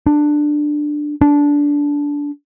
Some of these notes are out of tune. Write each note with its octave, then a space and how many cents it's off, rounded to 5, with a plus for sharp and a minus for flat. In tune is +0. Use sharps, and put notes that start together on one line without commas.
D4 +10
D4 -15